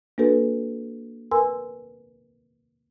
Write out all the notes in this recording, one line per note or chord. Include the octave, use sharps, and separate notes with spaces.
A#3 D4 F#4 A4 B4
A#4 B4 G#5 C6 E6